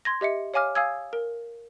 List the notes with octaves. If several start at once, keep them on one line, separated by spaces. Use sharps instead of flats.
C6 G#6 A#6
G4 D#5 E5 C#7
C#5 F5 G#5 D6 F6
F5 G#5 D#6 E6 G#6
A#4